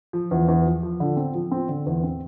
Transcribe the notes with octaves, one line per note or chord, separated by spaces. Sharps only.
F3
E2
E2
F3
F3
D3
C4
F3
C4
D3
E2
C4